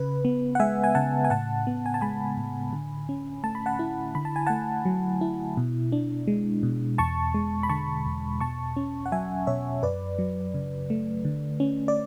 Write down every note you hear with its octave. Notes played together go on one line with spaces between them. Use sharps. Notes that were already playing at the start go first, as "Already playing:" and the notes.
Already playing: C#3 B4
B3
F#5
G#3 E5 G#5
G#5
C#3 F#5 A5
G#5
A2 F#5 A5
B3
G#5
A5
G#3 G#5 B5
A2
D3
C#4
A3 A5
B5
F#5 A5
E4
D3 B5
A5
G#5
A3 F#5 A5
F#3
E4
B2
D4
G#3
B2
E2 A5 C#6
G#3
B5
D3 A5 C#6
E2
B2 A5 C#6
C#4
F#5
F#3 E5 G#5
B2 C#5 E5
F#2 B4 D5
F#3
C#3
A3
D3
C#4
D5